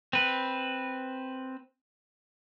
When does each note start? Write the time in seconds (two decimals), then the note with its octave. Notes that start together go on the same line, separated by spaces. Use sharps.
0.13 C4 B4